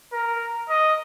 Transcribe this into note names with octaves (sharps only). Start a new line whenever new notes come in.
A#4
D#5